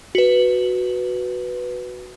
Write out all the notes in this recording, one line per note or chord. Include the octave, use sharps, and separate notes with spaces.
F#4 B4